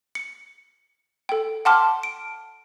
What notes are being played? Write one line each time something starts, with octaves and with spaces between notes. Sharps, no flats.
C#7
A4 G5
F#5 G5 A5 C6 D6 F6
D7